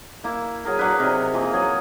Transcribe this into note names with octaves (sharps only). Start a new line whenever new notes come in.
A#3 E4
F#3 G#4 A#4
F#3 D4 B4
C3 D#4 A#4
E3 F3 A#3
F#3 G#4